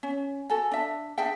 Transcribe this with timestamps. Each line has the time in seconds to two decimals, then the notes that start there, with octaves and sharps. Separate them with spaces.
0.03 C#4
0.50 F#4 A4 G#5
0.71 D4 E5
1.18 D4 G#4 E5 G5